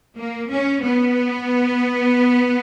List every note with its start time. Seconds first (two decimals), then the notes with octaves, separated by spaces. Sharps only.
0.17 A#3
0.50 C#4
0.82 B3